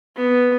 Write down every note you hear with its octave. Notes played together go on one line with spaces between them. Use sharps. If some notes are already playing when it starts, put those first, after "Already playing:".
B3